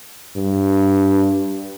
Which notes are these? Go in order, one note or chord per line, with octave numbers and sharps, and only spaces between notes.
G2